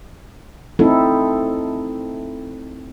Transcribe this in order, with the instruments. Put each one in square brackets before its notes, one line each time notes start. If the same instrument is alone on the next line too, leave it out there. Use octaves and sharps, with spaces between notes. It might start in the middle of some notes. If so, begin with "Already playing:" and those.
[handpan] A3 C4 D#4 E4 A4